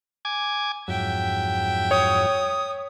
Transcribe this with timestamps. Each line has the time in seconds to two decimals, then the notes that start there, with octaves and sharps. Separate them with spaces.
0.25 G#5 D6 G#6
0.88 F2 G#2 F#3 E5 G5
1.91 C#5 D#6